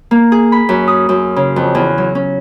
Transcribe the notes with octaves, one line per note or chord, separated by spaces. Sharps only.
A#3
G#4
B5
F#2
D#6
F#2
C#3
F2
E2
F#3
C#4